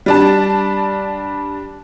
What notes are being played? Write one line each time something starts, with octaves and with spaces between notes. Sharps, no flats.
G3 D4 A5